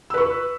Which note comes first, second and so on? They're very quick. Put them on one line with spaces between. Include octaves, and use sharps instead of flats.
E6 B4 C#6